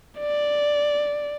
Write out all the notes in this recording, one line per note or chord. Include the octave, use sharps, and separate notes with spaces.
D5